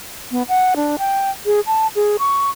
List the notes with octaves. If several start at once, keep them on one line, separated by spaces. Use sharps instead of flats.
B3
F#5
D4
G5
G#4
A5
G#4
C#6